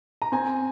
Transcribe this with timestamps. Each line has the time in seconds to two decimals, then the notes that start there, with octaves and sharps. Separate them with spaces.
0.22 A#5
0.32 C4 G#5